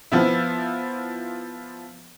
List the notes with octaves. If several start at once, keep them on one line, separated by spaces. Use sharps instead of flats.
F3 B3 E4